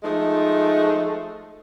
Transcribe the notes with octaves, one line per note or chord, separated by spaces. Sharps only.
F3 G#3 A3 D#4